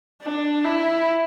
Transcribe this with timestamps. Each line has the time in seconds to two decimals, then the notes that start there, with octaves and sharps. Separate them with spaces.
0.22 D4
0.65 E4